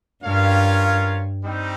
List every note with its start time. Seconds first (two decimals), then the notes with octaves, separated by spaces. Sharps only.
0.24 G2 C#4 F4 A#4 C#5 F5
1.44 G3 C4 D#4